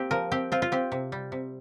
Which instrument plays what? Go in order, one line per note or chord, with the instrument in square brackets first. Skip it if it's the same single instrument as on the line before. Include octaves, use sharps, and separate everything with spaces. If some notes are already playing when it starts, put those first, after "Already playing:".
Already playing: [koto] A#3 C4 G4
F3 A#4
C4 G4
C4 F4
F4
C4 G4
C3
G3
C3